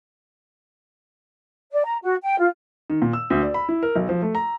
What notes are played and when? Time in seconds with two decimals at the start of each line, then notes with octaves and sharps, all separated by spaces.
1.72 D5
1.85 A#5
2.02 F#4
2.23 G5
2.39 F4
2.90 D#3
3.02 A#2
3.13 E6
3.30 D2
3.43 D5
3.54 B5
3.69 E4
3.83 A#4
3.96 B1
4.09 F3
4.22 A3
4.35 A#5